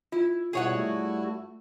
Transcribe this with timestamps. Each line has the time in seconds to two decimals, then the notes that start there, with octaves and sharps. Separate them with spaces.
0.12 E4 F4
0.53 G2 B2 E4 F#4 G#4 C#5 F#5
0.77 A3